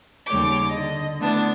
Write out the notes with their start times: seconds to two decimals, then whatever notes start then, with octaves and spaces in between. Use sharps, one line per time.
0.26 D#2 C#3 G3 C#5 D6 G6
0.68 D3 D#5
1.19 D3 A3 B3 D4 E4